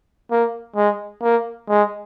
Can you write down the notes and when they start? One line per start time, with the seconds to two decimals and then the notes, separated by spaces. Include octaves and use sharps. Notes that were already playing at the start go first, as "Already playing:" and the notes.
0.31 A#3
0.76 G#3
1.23 A#3
1.69 G#3